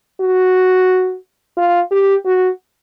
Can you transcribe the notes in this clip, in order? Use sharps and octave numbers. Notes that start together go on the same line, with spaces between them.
F#4
F4
G4
F#4